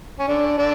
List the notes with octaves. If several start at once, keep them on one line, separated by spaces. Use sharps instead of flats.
C#4
D3 D4
D3 D4